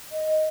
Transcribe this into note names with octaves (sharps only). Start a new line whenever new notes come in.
D#5